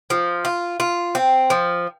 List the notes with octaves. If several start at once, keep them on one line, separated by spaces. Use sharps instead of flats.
F3
F4
F4
C4
F3